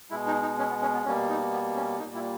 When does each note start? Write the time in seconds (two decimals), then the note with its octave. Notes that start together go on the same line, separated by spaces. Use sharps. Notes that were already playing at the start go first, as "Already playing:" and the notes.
0.10 B2 G#3 E4
0.27 D#4
0.42 D#4
0.58 C#4
0.70 B3
0.82 C#4
0.93 B3
1.05 B2 G3 A#3 C#4
1.29 D#4
1.53 B3
1.76 C#4
2.00 A#2 G3 A#3 D#4
2.15 E4